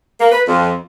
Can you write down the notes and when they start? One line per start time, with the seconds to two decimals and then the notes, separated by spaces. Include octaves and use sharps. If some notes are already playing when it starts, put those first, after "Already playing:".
0.19 A#3
0.32 B4
0.46 F2